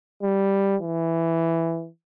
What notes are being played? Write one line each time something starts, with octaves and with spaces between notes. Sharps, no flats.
G3
E3